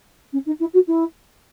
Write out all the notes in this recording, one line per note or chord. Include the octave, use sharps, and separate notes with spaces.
C#4
D#4
E4
F#4
E4